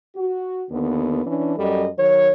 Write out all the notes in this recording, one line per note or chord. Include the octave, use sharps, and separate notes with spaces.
F#4
D#2 D3 B3
E3 C#4 D4
F#2 G3 A4 D#5
D#3 F#3 C#5